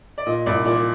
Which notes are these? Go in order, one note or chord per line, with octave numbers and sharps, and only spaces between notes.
D5
A#2 D#5
C2 D5
A#2 D5